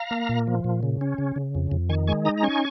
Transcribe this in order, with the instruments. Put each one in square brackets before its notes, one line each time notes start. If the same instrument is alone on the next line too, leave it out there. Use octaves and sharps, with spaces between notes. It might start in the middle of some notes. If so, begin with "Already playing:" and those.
Already playing: [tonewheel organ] F5 A#5
A#3
A#2
F3
A#2
C#3
C#4
C#3
C#3
F2
F2
D#3 G#5 C#6
G#3 G#5 C#6
D#4 A#5 D#6
A#5
C#4 G#5 C#6